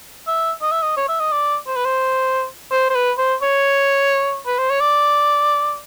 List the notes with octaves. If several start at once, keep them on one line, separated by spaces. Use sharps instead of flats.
E5
D#5
E5
D#5
C#5
E5
D#5
D5
C5
B4
C5
C5
C5
B4
C5
C#5
B4
C5
C#5
D5